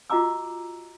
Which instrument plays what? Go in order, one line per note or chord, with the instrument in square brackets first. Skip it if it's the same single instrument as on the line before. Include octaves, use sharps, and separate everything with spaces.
[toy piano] F4 F#4 D#5 A#5 D6 E6